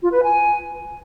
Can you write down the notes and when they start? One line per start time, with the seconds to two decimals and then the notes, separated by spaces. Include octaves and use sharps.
0.01 F4
0.12 B4
0.23 G#5